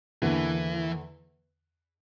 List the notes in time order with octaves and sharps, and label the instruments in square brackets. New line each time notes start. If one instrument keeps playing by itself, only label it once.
[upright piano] E2 D3 A#3 [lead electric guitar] E3